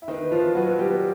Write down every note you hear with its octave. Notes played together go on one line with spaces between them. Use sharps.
E4
D#3 D#4 C5
B4
F3 F4
F#3 F#4
G3 G4